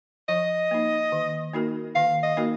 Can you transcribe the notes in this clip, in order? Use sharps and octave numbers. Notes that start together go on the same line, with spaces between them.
F3 D#5
A#3 D#4
D#3
A#3 D#4 F#4 A#4
D#3 F5
D#5
A#3 D#4 F#4 A#4